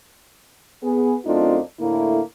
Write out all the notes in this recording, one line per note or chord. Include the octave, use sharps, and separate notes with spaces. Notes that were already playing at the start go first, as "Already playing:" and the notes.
B3 G#4
F#2 A3 C4 D4 D#4 F4
A2 D3 A3 A#3 E4